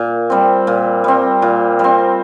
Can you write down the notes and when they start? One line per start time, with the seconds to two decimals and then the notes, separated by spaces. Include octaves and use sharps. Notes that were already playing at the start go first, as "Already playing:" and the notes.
Already playing: A#2
0.30 G3 C4
0.67 A#2
1.04 G3 C4
1.42 A#2
1.79 G3 C4